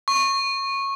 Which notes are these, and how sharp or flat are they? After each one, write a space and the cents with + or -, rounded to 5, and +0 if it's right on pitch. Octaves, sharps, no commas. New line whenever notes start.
C#6 -15